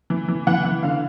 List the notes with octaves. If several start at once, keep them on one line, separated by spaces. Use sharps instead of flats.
E3
E3
E3 F#5
E3
D3 F5